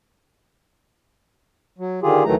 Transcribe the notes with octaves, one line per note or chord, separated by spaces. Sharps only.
F#3
D3 D#3 F4 G4 G#4
D2 D#3 E3 F#3 A3 A#5